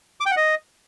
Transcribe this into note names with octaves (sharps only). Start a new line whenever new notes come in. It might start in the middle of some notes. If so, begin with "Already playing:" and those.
D6
G5
F#5
D#5